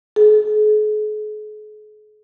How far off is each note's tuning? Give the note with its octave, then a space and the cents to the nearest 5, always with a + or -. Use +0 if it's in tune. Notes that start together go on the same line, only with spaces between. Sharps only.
G#4 +45